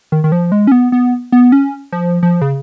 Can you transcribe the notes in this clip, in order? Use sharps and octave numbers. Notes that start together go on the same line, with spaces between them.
D#3
D#3
F3
G#3
C#4
B3
B3
B3
C#4
F3
F3
C#3